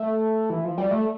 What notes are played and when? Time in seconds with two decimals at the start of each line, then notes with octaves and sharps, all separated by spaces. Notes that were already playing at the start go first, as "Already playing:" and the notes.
Already playing: A3
0.50 E3
0.64 F3
0.78 G3
0.91 A3